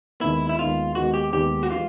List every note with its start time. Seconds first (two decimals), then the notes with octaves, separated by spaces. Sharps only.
0.21 D#2 D#3 G#3 B3 E4
0.49 E4
0.58 D#2 D#3 G#3 B3 F4
0.95 D#2 D#3 G#3 B3 F#4
1.14 G4
1.33 D#2 D#3 G#3 B3 G4
1.63 F#4
1.71 E3 G#3 F4